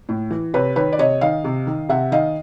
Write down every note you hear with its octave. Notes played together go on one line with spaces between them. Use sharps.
A2
E3
C3 B4 C#5
D#3 B4 C#5
D5
C3 C#5 D#5
D#3 D#5 F5
C3
D#3
C3 E5 F#5
D#3 D#5 F5